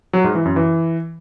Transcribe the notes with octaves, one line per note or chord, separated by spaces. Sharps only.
F#3
G#2
E3
F#2
E3